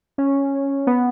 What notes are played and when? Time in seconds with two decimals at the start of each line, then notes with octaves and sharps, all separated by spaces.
0.18 C#4
0.87 B3